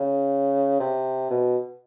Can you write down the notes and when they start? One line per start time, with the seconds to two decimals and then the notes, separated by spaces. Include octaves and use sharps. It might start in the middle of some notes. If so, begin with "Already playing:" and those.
Already playing: C#3
0.80 C3
1.30 B2